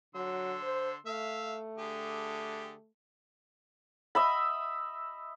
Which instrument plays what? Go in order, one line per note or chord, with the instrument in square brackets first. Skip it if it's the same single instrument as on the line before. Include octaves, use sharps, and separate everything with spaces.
[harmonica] D3 C6 E6 [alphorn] F#3
[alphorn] C5
[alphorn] A3 [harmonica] E5 F5
[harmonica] D3 G4 G#4
[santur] D#5 E5 B5